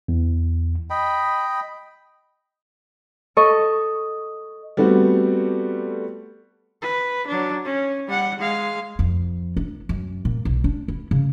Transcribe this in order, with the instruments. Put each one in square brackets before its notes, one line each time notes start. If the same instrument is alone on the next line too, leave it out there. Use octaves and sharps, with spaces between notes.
[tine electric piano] E2
[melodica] D#5 G5 B5
[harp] A4 D#5 C#6
[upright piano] G3 A3 B3 C4 F#4
[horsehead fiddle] B4
F#3 D4
C#4
G3 F#5
G#3 F5
[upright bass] F2
D4
F#2
A#2
B1
D4
E4
C#3